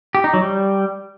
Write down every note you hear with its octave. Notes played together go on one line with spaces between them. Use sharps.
G4
D#4
F#3
G3